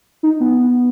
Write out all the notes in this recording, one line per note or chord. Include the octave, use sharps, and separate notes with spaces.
D#4
B3